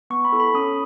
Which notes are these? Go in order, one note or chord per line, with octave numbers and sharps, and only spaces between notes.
B3 C#6
B5
E4 A4
B5
C#4 D#6